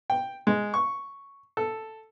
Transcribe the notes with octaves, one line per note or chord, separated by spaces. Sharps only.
G5
G#3
C#6
A4